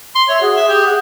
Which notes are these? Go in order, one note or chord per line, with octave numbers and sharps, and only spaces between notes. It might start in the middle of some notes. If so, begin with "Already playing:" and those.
C6
C#5 E5
F#4 G#4
E5
G4
F#5